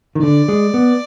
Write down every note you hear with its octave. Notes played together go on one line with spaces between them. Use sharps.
D#3
D3 D5
G#3
B3